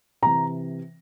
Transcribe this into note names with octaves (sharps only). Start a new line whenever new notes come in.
C3 E3 A#5